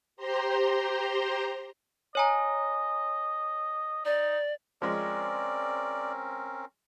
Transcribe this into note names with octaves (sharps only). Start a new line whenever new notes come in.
G4 C5 A#5 C6
C#5 D#5 G#5 A#5
D#4 D5
F3 G#3 C4 C#4 A#4 D5